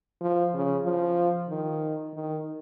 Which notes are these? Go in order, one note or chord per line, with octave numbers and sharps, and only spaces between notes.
F3
C#3
F3
D#3
D#3